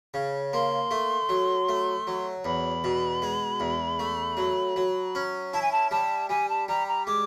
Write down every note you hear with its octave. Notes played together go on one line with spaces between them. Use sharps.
C#3
A#3 C6
A3
F#3
A3
F#3
E2 B5
B2
G#3
E2
A3
F#3
F#3
C#4
E4 A5
G#5
A5
G3 A5
G3 G#5
A5
G3 A#5
A#5
G#3 D6